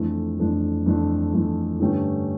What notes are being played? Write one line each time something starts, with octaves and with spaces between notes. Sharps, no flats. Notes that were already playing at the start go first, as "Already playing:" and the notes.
Already playing: F2 E3 A3 D4
F2 E3 A3 D4
F2 E3 A3 D4
F2 E3 A3 D4
G2 D3 A3 C#4 G4